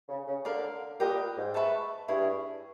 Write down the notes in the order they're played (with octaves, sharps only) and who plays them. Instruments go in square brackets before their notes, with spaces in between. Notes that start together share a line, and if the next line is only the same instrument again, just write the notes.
[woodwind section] C#3
C#3
[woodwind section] D3 [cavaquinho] A#4 D5 F5
[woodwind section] A#2 [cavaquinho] G4 B4 D#5
[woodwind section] G#2
[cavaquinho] B4 E5 A5 C#6
[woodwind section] G2 [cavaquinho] E4 G#4 C#5